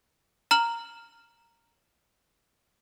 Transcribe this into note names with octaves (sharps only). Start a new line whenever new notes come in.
A#5 F6 F#7